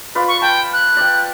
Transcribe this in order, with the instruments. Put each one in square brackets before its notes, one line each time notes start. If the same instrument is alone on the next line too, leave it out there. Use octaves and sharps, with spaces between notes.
[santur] F4 B4 D5
[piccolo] C#6
[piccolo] G5 [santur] A5
[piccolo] F#6
[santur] D5 G5